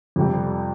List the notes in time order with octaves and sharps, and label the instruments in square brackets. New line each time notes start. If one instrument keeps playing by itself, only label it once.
[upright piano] F2 C3 G3